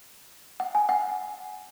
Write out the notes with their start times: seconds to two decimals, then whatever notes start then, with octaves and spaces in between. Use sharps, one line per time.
0.60 F#5
0.75 G#5
0.89 F#5